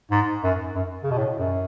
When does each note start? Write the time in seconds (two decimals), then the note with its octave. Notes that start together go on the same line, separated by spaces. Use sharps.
0.11 G#2
0.44 F#2
0.75 F#2
1.03 C#3
1.11 B2
1.18 A2
1.39 F#2